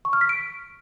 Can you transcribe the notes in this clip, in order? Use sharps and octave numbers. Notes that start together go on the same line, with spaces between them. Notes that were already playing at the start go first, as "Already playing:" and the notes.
C#6
F6
B6
D7